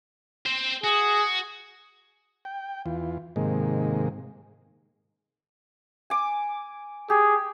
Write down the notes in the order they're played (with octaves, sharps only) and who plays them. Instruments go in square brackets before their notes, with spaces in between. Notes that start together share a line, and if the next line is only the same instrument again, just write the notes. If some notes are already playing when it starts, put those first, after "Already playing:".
[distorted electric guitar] C4 C5
[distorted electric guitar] F#4 [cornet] G#4
[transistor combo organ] G5
E2 E3 F4
G#2 C3 D#3 G#3 A#3
[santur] G#5 D6
[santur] G4 [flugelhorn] G#4